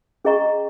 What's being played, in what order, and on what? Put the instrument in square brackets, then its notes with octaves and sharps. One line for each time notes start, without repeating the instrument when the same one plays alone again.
[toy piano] C#4 G#4 D#5 A#5 C#6